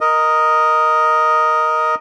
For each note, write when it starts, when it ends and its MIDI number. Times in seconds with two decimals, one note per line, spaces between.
0.01 1.95 70
0.01 1.95 75